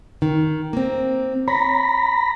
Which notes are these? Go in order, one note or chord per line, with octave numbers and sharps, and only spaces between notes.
D#3
A#3 C4
C#5 A#5 B5